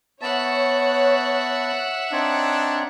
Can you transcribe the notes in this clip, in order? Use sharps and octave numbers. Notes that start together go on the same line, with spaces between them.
B3 C#5 E5 F#5 A5
C4 D4 D#4 C#5